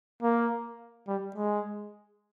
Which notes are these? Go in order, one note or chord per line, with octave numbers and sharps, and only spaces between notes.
A#3
G3
G#3